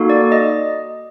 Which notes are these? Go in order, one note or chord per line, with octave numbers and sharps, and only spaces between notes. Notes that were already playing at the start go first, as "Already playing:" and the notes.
Already playing: A#3 D#4 F#4 A4
D5
D#5